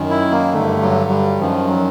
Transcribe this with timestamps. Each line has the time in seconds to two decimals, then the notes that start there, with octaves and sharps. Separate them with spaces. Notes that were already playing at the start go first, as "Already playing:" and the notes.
Already playing: F#2 D#3
0.10 E4
0.31 A#3
0.53 G2 D3 A3
0.82 F#3
1.10 G3
1.39 F#2 D#3 F3
1.68 F#3